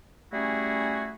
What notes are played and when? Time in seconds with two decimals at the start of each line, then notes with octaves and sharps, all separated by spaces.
0.32 G3 A3 C#4 E4 F#4 G#4